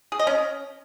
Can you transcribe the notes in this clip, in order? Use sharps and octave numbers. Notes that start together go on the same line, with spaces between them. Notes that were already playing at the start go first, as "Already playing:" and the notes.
G#4
D#5
C#4